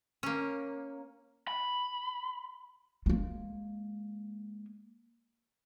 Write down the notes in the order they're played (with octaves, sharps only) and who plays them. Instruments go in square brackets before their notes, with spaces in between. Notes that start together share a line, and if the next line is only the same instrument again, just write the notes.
[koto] A#3 C#4
[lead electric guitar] B5
[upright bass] G#3 A#3